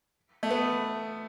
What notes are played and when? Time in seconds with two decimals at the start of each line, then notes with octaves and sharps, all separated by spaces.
0.43 A3
0.51 B3